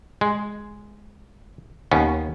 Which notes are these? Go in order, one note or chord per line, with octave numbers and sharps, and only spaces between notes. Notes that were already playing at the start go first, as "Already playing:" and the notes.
G#3
D#2 B3 C#4